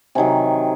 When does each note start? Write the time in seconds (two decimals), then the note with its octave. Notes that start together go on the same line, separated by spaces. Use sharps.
0.15 C3 D#3 F#3 G#5